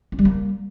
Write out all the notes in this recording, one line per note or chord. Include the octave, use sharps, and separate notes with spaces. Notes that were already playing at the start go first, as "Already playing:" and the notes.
C#4
G3
A#3